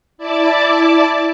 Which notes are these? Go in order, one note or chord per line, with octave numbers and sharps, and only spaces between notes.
E4 D5 A5 D6